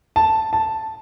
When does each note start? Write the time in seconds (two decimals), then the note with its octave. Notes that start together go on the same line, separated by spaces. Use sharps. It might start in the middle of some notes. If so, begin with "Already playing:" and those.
0.16 A5
0.53 A5